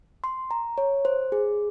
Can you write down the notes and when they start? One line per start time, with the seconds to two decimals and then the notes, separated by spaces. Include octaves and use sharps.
0.24 C6
0.51 A#5
0.78 C#5
1.05 C5
1.32 G#4